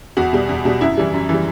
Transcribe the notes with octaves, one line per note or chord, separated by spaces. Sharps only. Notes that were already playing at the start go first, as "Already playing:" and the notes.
E2 F#4
B2 G3
E2
B2 G3
F#2 E4
E3 G3
F#2
E3 G3